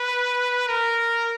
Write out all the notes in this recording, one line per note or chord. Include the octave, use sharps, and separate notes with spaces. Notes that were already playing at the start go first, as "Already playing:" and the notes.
Already playing: B4
A#4